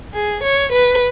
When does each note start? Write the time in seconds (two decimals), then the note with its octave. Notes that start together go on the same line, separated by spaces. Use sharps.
0.14 G#4
0.43 C#5
0.72 B4